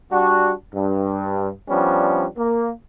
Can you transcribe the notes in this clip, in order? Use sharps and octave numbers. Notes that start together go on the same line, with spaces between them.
G3 D4 F#4
G2
F3 G3 B3 C#4 D4
A#3